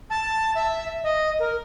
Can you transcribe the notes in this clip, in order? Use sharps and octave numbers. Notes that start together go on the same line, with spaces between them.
A5
E5
D#5
A#4